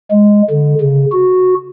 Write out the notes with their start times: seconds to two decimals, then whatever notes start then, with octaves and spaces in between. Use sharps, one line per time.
0.11 G#3
0.50 D3
0.81 C#3
1.12 F#4